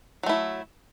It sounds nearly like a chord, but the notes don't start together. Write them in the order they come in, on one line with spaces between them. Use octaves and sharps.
F#3 A3 E4